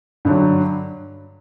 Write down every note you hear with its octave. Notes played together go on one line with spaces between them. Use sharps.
G2 D3 F#3